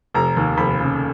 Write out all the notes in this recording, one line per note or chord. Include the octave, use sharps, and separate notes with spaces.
F1 A#5
D#2
F1 B5
C#3